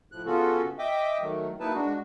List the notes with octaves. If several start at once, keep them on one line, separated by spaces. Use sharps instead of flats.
A2 F3 F#6
C#3 B3 C#4 F4 F#4 A4
D#5 E5 G5 D6
D#3 F#3 A3
F#3 A#3 D#4 E4 B4 A5
G#3 D4 F#4